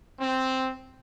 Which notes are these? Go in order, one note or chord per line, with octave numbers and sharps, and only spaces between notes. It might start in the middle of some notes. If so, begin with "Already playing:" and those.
C4